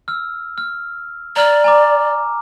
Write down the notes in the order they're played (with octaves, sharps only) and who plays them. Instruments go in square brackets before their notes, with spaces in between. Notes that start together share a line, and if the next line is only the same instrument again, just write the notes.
[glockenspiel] E6 F6
F6
[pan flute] D5 [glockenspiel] A#5 F6
[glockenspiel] G#5 A#5 D6